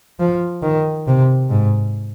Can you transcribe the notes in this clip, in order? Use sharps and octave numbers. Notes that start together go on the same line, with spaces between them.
F3
D#3
C3
G#2